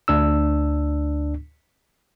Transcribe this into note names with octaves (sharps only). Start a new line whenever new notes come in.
D2 D4 E6